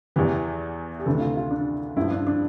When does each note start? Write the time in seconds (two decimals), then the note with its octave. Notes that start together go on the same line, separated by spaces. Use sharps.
0.16 E2 E3 G4
1.00 G4
1.06 D2 C3 E3 A4
1.21 F4
1.37 F4
1.51 D4
1.97 G2 F3 E4
2.11 D4
2.27 D4